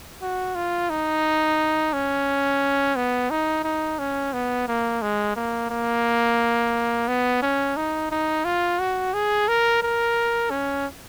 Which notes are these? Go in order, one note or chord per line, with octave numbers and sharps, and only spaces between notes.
F#4
F4
D#4
C#4
B3
D#4
D#4
C#4
B3
A#3
G#3
A#3
A#3
B3
C#4
D#4
D#4
F4
F#4
G#4
A#4
A#4
C#4